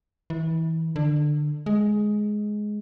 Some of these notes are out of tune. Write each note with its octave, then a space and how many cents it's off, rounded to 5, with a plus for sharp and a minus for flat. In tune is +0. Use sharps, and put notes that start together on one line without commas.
E3 -30
D3 +20
G#3 +10